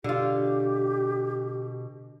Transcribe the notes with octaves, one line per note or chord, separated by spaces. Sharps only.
B2 D3 F4 G4